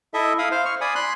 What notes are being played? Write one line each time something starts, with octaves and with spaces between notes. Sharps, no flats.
E4 A4 D#5 E5
E4 F5 B5 D#6
C5 F5
C#6 F6
D5 G#5 B5 D#6
B5 C6 F#6